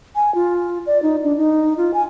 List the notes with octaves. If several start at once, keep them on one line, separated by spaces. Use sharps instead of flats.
G#5
F4
D5
D#4
D4
D#4
F4
G#5